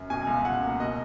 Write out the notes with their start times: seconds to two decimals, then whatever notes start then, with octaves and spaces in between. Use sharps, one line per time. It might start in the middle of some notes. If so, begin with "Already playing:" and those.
Already playing: F#2
0.10 B2 G#5
0.27 C#2
0.45 C#2 F#5
0.62 A#3
0.80 B2 D#5